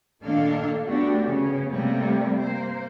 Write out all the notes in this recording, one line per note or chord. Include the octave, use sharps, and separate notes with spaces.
A#2 D#3 A#3 D4 A4 F5
A3 B3 D4 F#4 G4
C#3 B3 C#4
C3 G3 A3 A#3
A#3 C5